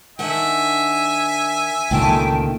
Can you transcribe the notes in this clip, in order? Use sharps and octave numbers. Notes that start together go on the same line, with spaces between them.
D#3 D4 E5 F#5 G#5
C#2 A#2 D3 D#3 A3 G5 A5